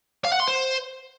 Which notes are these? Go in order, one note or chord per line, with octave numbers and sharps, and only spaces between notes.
F5
F#5
C6
C5